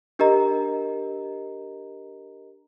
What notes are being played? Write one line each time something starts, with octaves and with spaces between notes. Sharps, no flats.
D4 G4 A#4 D#5 A#5